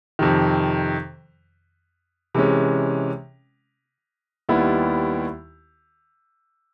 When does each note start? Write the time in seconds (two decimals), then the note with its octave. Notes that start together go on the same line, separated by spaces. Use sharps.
0.19 F2 C3 D#3
2.35 C3 E3 G#3 C#4
4.49 D#2 D#3 G3 B3 E4